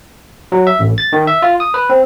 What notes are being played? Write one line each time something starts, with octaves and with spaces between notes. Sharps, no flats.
F#3
E5
A1
A6
D#3
E5
F4
D#6
B4
C4